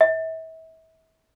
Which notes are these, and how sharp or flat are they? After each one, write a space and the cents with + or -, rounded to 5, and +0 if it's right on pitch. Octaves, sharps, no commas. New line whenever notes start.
E5 -35